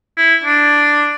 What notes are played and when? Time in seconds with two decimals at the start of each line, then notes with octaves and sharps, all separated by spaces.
0.17 E4
0.43 D4